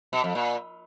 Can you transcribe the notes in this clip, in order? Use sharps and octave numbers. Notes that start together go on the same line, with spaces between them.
B2
F2
A#2